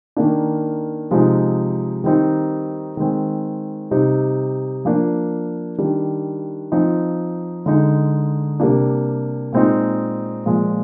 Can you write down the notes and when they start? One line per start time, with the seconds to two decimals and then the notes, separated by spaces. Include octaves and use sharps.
0.17 D#3 A#3 D4
1.11 C3 F3 G#3 C4 D#4
2.04 D#3 G3 C4 D#4
2.97 D#3 G#3 C4
3.91 C3 G3 C4 D#4
4.85 F3 A#3 D4
5.78 D#3 G3 D4
6.72 F3 C4 D#4
7.66 D3 G#3 D#4
8.60 C3 G3 A#3 D4
9.53 A#2 G#3 C4 D#4
10.46 A#2 F3 G#3